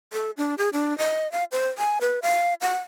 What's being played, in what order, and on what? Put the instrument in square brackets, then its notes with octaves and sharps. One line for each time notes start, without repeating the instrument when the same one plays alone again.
[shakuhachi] A4
D4
G#4
D4
D#5
F5
C5
G#5
B4
F5
F#5